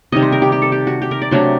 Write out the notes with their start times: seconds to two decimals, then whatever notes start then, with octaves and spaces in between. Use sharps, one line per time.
0.12 C3 D#3 G3 D#5
0.22 C5
0.32 A#4
0.42 G4
0.52 G4
0.62 A4
0.72 G4
0.87 F#4
1.02 G4
1.11 A#4
1.22 D5
1.31 C3 F#3 A3 D4 C6